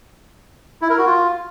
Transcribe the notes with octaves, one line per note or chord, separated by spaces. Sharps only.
E4
A#4
F#4
F4